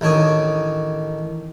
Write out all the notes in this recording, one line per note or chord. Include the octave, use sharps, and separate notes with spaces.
A1 D#3 D4 C#5 D#6